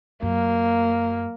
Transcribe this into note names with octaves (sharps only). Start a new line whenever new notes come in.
F#2 A#3